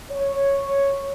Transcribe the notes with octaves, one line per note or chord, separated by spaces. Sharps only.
C#5